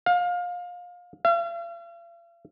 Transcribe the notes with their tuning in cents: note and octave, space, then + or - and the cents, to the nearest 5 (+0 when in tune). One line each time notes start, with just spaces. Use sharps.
F5 +25
F5 -45